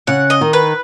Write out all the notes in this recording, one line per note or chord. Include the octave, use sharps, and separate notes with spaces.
C#3 F#5
D#5
D#3
B4